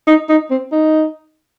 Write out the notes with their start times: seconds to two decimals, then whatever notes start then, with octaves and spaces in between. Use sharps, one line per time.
0.07 D#4
0.29 D#4
0.50 C4
0.72 D#4